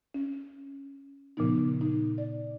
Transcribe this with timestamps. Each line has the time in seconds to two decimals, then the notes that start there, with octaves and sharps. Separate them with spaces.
0.14 C#4
1.37 A#2 C#3 F3 B3 D#4
1.81 D#4
2.18 D5